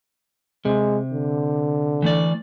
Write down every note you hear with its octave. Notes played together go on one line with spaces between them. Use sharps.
C3 G#3
D3
E3 A3 D5